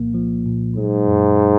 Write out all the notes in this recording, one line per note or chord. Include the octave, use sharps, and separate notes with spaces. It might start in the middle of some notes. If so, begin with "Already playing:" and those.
Already playing: C2 A#2 F3 A#3
F3
A#2
G#2 F#3
F#2